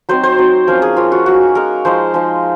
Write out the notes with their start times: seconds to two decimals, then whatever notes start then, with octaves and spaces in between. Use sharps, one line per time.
0.09 F#3 C4 D#4 C5
0.23 C5
0.38 F#3 C4 D#4
0.67 F3 A#3 C#4 A#4
0.82 G#4
0.97 F3 A#3 C#4 F4
1.12 F#4
1.26 G#3 D#4 F#4
1.55 G#3 D#4 A#4
1.85 F3 G#3 D#4 C5
2.14 F3 G#3 D#4